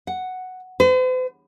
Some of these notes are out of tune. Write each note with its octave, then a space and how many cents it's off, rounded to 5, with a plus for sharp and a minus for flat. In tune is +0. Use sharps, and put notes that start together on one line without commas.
F#5 +0
C5 -45